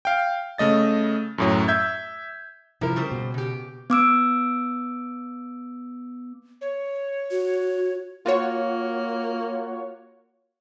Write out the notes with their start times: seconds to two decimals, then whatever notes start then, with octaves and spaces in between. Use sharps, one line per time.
0.05 F5 G5
0.58 C#3 A3 D#5 A6
1.38 F#2 A2 F#3
1.68 E5 G6 G#6
2.81 C3 F3 E4 A#4
2.96 C#3 G3 C5
3.12 B2
3.34 C#3 G4
3.90 B3 D6 E6 D7
6.61 C#5
7.31 F#4
8.26 A#3 F4 F#4 C#5